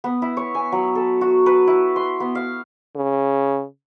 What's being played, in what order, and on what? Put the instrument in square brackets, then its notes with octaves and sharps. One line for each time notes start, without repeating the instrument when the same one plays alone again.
[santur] B3
E4
C#5
G#5
F#3
A4
F#4
B4
E4
C6
B3
F5
[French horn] C#3